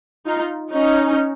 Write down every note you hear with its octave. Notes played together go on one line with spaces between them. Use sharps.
D#4 F4
C#4 D#4